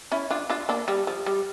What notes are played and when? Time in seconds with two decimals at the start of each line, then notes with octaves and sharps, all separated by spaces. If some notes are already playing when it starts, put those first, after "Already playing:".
0.12 C#4 E4
0.30 D4 F4
0.50 D4 F4
0.69 A#3 D4
0.88 G3
1.07 F3
1.26 G3